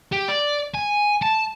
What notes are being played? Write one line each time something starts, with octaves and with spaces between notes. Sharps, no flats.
G4
D5
G#5
A5